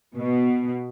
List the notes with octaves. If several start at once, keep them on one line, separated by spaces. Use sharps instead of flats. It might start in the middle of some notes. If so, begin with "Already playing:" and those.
B2